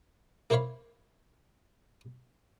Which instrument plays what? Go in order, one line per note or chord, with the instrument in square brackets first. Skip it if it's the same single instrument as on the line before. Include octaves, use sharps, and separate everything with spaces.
[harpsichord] A#3 E4 C5 C#5 F5 B5